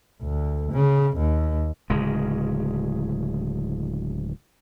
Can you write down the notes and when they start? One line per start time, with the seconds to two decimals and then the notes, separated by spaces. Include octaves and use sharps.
0.22 D2
0.72 C#3
1.17 D#2
1.90 D1 C#3 G#3